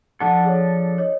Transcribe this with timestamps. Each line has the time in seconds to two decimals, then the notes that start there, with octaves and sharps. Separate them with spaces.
0.20 F3 D4 A4 F#5 A5
0.45 G#4 C#5
0.98 C#5 D#5